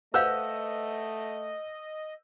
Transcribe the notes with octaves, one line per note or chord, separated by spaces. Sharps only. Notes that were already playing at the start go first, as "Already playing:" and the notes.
A3 B4 C5 D#5 F5 F#5 E6 G6